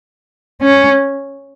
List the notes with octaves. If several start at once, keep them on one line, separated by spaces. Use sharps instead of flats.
C#4